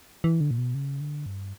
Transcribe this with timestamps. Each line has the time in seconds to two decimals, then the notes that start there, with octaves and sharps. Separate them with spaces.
0.24 E3
0.41 D3
0.51 A#2
0.58 B2
0.75 C#3
1.00 D3
1.26 G2